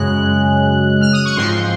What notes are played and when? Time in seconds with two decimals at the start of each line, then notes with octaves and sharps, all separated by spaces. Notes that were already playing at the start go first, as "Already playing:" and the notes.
Already playing: F#2 C#3 G#3 F#6
1.01 F6
1.13 D#6
1.25 C#6
1.37 G#2 F3 C4 C6